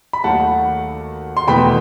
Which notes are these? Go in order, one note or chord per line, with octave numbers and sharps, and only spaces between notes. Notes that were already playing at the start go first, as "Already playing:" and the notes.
B5
D#2 D#3 F#3 A3 F#5 A5
C6
E2 B2 A3 G5 B5